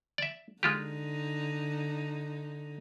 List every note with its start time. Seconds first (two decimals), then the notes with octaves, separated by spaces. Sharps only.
0.18 D5 E5
0.63 D3 G#3 D#4 F4 G4